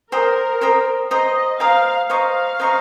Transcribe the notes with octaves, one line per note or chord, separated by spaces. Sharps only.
A#4 C5 G5 A#5 D#6
C5 G5 A#5 D#6
C5 D#5 G5 A#5 D#6
C5 F5 G5 A#5 D#6
C5 D#5 F5 A#5 C#6
C5 D#5 A#5 C#6